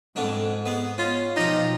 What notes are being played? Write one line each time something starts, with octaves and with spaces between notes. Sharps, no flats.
F2 G#2 D3 D4
G#3 B3
C#4 F4
B2 F3 D#4 F4 G4